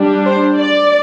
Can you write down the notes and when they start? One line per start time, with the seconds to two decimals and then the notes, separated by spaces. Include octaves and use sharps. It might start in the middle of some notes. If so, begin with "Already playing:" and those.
Already playing: G3 D4
0.25 C5
0.57 D5